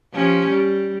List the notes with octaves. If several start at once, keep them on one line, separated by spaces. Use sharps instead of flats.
F3 C#4 G4
G3